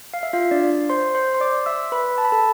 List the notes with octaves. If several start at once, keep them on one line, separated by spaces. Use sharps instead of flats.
F5
E5
F4 F5
D4 D5
C5 C6
C5 C6
C6
D5 D6
E5 E6
B4 B5
A5
B5
A4 A5